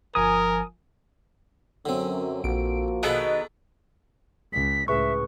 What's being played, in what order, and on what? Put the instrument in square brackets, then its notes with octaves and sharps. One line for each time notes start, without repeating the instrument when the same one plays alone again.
[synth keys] G1 F3 G#5 [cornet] A#4 [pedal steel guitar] D#6
[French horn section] F#2 [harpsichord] D3 C4
[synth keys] A#1 D7 [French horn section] F3 A#3 F#4
[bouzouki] B2 D#3 B3 [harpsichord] G#4 A4 B5 [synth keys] F#6 A6
[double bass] C#2 [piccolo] B6
[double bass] C#2 A2 [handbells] G#4 B4 C#6 [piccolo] E5